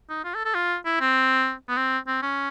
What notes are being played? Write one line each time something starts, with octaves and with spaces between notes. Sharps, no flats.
D#4
F4
A4
A4
F4
E4
C4
B3
C4
C4
C#4